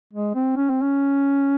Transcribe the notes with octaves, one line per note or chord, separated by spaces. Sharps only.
G#3
C4
C#4
C4
C#4